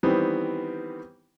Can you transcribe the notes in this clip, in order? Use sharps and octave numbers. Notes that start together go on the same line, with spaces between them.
D#3 E3 G3 B3 C4